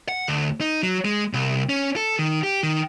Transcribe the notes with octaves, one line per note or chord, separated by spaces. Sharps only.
F#5
D2
D#4
F#3
G#3
C2
C#4
A4
D#3
G4
D#3